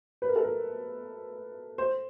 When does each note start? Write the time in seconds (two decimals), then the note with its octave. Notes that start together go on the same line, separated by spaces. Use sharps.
0.22 B4
0.28 A#4
0.36 A4
0.44 A#4
1.78 C5